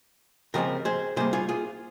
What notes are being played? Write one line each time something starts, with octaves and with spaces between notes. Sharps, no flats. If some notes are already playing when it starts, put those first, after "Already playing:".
C#3 F3 G#3 C4 G4 A#4
G#4 C5
C3 G3 A#3 G#4 C5
F4 G#4
F4 G#4